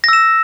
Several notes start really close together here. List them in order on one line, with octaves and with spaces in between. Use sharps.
A#6 E6 E7